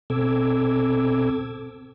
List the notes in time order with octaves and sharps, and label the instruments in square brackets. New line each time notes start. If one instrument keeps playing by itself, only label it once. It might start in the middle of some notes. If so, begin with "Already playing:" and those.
[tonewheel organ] B2 C4 A4 D6 E6 G#6